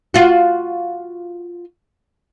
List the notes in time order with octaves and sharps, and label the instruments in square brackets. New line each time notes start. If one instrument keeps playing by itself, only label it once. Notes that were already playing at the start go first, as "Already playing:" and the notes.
[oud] F4 F#4